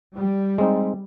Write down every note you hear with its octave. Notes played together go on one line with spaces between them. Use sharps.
G3
G#3 C4 D#4